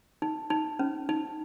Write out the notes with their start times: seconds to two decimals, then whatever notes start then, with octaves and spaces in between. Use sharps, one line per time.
0.22 D#4
0.50 D#4
0.79 C#4
1.09 D#4